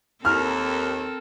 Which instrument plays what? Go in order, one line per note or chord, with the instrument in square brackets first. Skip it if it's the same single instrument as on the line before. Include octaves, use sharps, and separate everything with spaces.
[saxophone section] D#2 [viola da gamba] C4 A4 A#4 [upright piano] F6